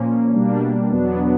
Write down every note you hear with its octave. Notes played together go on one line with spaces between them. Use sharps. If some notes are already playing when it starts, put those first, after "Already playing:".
Already playing: A#2 F3 A#3 C#4
B2 G3 A#3 D4
E2 B2 F#3 B3 D4